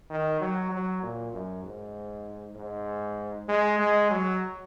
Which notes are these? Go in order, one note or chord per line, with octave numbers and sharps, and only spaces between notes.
D#3
F#3
F#3
A#2
F#2
G#2
G#2
G#3
G#3
F#3